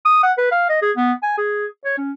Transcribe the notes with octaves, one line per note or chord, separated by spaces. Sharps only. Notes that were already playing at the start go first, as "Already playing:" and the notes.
D#6
F#5
B4
F5
D#5
G#4
B3
G#5
G#4
C#5
C#4